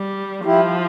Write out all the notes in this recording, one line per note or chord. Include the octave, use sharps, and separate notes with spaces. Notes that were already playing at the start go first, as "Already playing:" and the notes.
Already playing: G3
F3 E4 G4